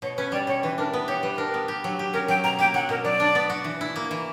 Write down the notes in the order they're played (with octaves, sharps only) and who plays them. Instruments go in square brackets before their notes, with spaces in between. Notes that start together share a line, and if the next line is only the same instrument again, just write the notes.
[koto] B2 [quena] C#5
[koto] C#4 [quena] B4
[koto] G3 [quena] D5
[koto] B2 [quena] C#5
[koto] E3 [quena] B4
[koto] D4 [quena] A#4
[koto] B3 [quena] B4
[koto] G4 [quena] C#5
[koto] G3 [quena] B4
[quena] B4
[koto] D4 [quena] A#4
[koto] B3
G4
F#3
G4
[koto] C#4 [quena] A#4
[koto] F#3 [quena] G5
[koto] B2 [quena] A#5
[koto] A#3 [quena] G5
[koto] F#3 [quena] F#5
[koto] B2 [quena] A#4
[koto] F#3 [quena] D5
[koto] D4
B3
F#4
E3
E4
A#3
E3